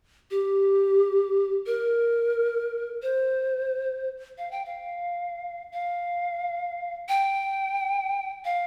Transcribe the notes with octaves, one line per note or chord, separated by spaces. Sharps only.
G4
A#4
C5
F5
G5
F5
F5
G5
F5